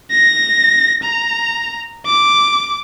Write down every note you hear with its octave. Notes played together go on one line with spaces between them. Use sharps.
A#6
A#5
D6